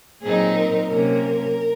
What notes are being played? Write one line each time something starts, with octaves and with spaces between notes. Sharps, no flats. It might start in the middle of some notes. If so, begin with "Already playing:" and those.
A#2 F#3 C4 D#4 G#4
A#4
C3 F#3 A#3 C#4 A#4